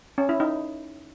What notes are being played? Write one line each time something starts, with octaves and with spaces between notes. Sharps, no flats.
C#4
E4
D#4